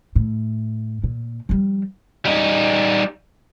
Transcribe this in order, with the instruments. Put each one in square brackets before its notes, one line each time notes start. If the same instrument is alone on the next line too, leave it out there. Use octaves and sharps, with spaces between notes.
[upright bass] A2
A#2
F3 G3
[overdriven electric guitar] G3 D#4